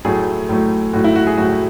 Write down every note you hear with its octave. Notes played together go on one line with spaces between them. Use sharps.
A2 F#3 A3 G#4
A2 F#3 A3
A2 F#3 A3 F#4
E4
F#4
G#4
A2 F#3 A3 F#4